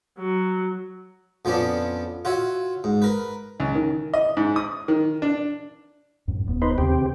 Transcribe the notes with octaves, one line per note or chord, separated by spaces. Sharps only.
F#3
F2 F3 B3 C#4 D4
F4 F#4 C#5 E5
G#2
A#4 B4
C#2
D#3
D#5
G#2
D#6
D#3
D4
F#2 A2
D#1 B3
D#4 B4 C5
D#2 C#3 C4 G4
C#3